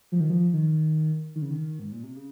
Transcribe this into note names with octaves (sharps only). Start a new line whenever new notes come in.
F3
D#3
F3
D#3
D#3
C#3
D#3
G#2
A#2
C3
C#3